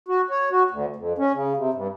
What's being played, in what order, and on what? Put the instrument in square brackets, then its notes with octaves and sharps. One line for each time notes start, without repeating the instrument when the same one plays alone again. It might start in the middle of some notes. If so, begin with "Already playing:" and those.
[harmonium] F#4
C#5
F#4
D2
F2
C#4
C#3
C3
G2